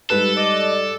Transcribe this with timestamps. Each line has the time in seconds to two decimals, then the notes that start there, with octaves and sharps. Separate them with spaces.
0.10 G#2 G3 A4 B4 F#6
0.37 D5 D#5